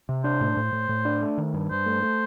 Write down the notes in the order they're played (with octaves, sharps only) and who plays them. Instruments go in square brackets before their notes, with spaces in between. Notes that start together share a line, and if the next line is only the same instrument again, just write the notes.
[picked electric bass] C3
[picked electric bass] D4 [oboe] C5
[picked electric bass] A2
A2
A2
A2
D4
A3
D#3
G2
[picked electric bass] G2 [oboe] C5
[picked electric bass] A3
A3